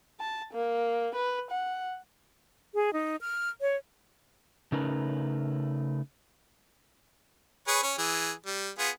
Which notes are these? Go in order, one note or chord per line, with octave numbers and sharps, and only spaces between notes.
A5
A#3
B4
F#5
G#4
D#4
F6
C#5
C#3 A3 C#4 D#4 A#4 B4
G#4 B4 C#5
C#4 C#5
E3 G#4
G3
B3 F4 G#4